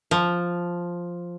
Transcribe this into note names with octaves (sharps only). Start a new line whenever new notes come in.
F3